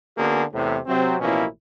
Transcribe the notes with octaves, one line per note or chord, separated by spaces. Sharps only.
D3 A#3 B3 C#4 F#4 G#4
E2 A2 C3
C3 F#3 C4
A1 B2 F3 A#3 C#4 E4